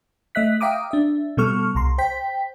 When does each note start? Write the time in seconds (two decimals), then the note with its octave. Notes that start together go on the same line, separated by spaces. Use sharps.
0.35 A3 D#5 E5 F#6 B6
0.60 E5 F5 G5 A#5 D6 D#6
0.91 D4 E5
1.37 B2 G3 B3 A4 C#6 F6
1.75 C2 A#5 C6
1.98 C5 G5 B6